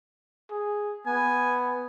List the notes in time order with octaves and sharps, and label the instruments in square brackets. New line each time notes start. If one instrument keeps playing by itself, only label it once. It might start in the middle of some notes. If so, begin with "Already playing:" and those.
[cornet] G#4
[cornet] B3 [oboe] G#5